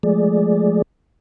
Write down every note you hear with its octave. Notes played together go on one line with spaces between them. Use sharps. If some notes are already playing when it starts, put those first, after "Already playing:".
F3 G#3 A3 G#4 D5